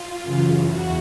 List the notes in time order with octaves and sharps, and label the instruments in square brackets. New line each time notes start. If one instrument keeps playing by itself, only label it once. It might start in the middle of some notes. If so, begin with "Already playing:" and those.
Already playing: [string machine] F4
F#2 C#3 E3
E2 F#4